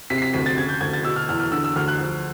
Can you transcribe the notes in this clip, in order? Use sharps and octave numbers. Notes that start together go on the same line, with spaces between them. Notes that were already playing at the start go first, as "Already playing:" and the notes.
C3 B6
C7
B6
D2 B6
A6
C#3 G#6
G6
D2 G#6
A6
B2 E6
F6
E2 F6
F6
D3 E6
E6
D2 F6
F#6
F3